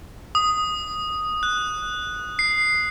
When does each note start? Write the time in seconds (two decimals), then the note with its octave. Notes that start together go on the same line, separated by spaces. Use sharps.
0.35 D#6
1.43 F#6
2.39 C7